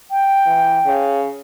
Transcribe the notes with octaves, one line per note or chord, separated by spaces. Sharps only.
G5
E3
C#3